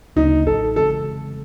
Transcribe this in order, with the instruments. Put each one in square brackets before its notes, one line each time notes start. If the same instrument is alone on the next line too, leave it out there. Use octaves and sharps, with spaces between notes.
[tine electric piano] D2 C#3 F#3 A#3 D4 [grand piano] D#4
[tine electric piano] A1 A2 F#3 [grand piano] A4
[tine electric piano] C#3 E3 G#3 C4 [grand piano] A4